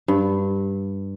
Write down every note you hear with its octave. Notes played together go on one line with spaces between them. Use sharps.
G2